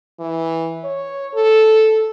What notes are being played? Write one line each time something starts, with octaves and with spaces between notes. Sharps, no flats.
E3
C#5
A4